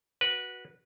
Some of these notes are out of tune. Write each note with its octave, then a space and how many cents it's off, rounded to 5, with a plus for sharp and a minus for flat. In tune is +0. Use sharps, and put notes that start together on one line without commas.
F#4 +0 B4 -20